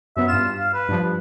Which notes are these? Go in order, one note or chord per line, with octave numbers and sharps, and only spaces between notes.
F#2 B3 E5
G2 F4 E7
F5
B4
G2 F3